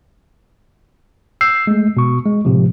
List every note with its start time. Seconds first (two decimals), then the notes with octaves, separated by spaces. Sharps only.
1.41 E6 G6 C7
1.67 G#3 A3
1.97 B2 C#6
2.26 G#3
2.45 A2 C3 F3